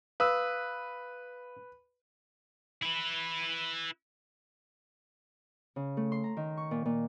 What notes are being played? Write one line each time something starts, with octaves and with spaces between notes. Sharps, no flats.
B4 F5 D#6 E6
E4 B4
C#3
A3
C6
A#5
D#3
C#6
A#2
A#2